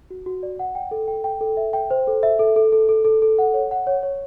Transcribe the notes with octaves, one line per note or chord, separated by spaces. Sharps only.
F#4
F#4
D5
F#5
G5
A4
G5
G5
A4
E5
G5
C5
A4
E5
A4
A4
A4
A4
A4
A4
F#5
C#5
F#5
C#5
C#5